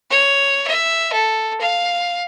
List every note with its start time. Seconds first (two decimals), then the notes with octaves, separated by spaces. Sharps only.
0.10 C#5
0.67 E5
1.13 A4
1.61 F5